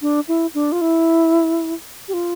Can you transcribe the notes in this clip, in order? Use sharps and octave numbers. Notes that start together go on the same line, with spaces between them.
D4
E4
D4
F4
E4
G4
F4